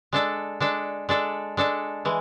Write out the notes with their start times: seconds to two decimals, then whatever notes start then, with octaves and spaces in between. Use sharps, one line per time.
0.13 G#3 D4 A4
0.60 G#3 D4 A4
1.09 G#3 D4 A4
1.57 G#3 D4 A4
2.05 E3 G#3